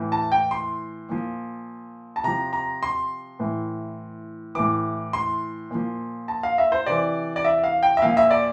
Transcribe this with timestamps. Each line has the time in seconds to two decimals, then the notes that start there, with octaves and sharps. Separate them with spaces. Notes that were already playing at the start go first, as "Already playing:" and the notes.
Already playing: A2 E3
0.12 A5
0.32 G5
0.51 C6
1.09 A#2 F3
2.16 A5
2.24 C3 F3 A#5
2.53 A#5
2.83 C6
3.39 A2 E3
4.55 A2 E3 D6
5.13 C6
5.71 A#2 F3
6.28 A5
6.43 F5
6.58 E5
6.72 C5
6.86 C3 E3 D5
7.36 D5
7.45 E5
7.64 F5
7.83 G5
7.97 E5
8.02 A#2 F3 F5
8.17 E5
8.31 D5